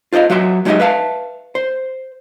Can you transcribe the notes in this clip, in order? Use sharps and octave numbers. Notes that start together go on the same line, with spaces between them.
F4 C5 D5 D#5 F5
F#3 F#4 E5 C6
F#3 G#3 D#4 G4 D#5 E5
B4 E5 F5 A5
C5